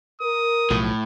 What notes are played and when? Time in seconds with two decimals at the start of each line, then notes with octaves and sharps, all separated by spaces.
0.21 A#4 D#6
0.70 B1 A2 F3